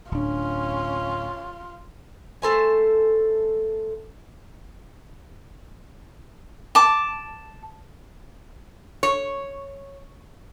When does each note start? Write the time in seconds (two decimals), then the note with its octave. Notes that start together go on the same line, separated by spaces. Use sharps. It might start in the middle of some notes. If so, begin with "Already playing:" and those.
0.12 D1 C#4 D4 F4
2.42 A3 A4 C5 G#5
6.75 A5 D6
9.03 C#5